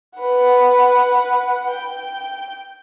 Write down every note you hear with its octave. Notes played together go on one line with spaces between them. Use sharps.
B4 F#5
G5